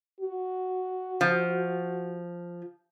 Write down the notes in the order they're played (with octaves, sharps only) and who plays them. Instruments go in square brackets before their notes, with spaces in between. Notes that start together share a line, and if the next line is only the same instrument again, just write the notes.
[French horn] F#4
[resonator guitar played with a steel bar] F3